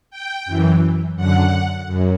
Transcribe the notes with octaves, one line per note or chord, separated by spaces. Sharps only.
G5
F#2 E3
F#2 D3 F#5
F#2